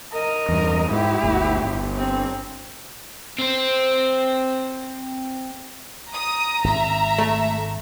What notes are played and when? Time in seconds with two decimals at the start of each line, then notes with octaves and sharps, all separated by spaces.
0.13 A#4 D#5
0.49 E2 G2
0.91 G#2 E4 G4
1.23 G1 D2
1.65 G1
1.98 C4
3.39 C4 C5
6.13 A#5 D#6
6.64 G#1 E5
7.18 A3